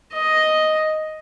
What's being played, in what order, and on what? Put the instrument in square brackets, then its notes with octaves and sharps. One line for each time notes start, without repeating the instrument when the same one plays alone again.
[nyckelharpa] D#5